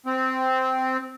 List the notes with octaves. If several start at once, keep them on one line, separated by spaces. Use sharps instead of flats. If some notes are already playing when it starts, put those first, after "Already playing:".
C4